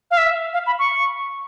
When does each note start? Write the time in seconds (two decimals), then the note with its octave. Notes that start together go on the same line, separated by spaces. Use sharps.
0.11 F5
0.17 E5
0.53 F5
0.66 B5
0.79 C#6